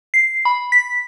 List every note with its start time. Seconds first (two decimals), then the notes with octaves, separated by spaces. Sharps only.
0.14 C7
0.45 B5
0.72 B6